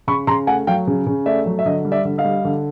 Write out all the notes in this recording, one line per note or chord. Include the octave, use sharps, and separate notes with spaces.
C#3 B5 C#6
C#3 A#5 C6
A3 F#5 G#5
F#3 F5 G5
C#3
C#3
A3 D5 E5
F#3
E5
D3 D#5
G3
D5 E5
D3
D#5 F5
G3
D3